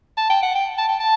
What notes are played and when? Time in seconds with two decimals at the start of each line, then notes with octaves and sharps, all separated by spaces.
0.17 A5
0.30 G5
0.43 F#5
0.55 G5
0.78 A5
0.89 G5
0.99 A5